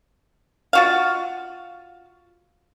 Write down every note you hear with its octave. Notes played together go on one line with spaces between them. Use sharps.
F4 F#4 F5